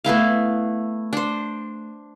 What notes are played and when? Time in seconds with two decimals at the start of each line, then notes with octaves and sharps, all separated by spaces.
0.04 A3 B3 E4 F5
1.13 D4 C5